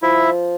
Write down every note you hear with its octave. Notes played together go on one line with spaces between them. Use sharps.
F3 E4 E5